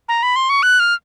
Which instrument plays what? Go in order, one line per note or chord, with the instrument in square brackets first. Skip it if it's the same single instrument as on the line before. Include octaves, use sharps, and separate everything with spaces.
[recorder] A#5
B5
C6
C#6
F#6
F6